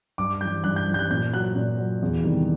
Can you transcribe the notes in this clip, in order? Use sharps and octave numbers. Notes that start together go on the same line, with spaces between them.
G2 D6
E3 G3 G6
G2 F#6
G6
G3
E3 G6
F#6
A#2 G6
F#3 F#6
A#2
F#3
E2
C3 D#3 G3